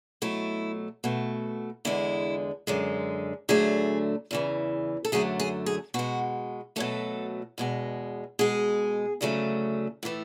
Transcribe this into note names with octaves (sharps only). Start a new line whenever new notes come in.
B2 F#3 A3 E4
B2 A3
E2 D3 G#3 E4
F#2 D3 G#3
D2 D3 F#3 A3 G#4
E2 C#3 E3
A4
F#2 D3 F#3 A3 G#4
G#4
G#4
B2 G#3 F#4
B2 F#3 A3 A4
E2 B2 G#3
B2 G#3 G#4
D2 C#3 F#3 A3
A2 E3 A3